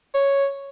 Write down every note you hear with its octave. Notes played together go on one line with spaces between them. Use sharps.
C#5